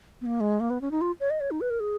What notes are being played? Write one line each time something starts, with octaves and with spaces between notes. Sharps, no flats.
B3
A#3
G#3
A#3
B3
C#4
D#4
F4
C#5
D#5
C#5
D#4
B4
A#4
G#4